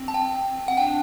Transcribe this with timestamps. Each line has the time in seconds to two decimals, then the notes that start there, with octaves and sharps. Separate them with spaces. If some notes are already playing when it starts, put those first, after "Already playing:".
Already playing: C4
0.08 A5
0.14 G5
0.68 F#5
0.77 D4 G5